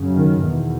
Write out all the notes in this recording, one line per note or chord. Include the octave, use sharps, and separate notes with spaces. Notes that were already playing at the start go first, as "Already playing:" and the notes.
Already playing: F#2 C#3
D#3
E2 B2